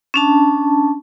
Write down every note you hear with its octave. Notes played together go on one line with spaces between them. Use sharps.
C#4 D4 A5